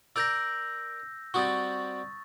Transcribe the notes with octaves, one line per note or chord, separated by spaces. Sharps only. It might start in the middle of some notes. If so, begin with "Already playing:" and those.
A#4 D5 E6 G6 A#6
G3 C4 F#4 C#6 D#6 A6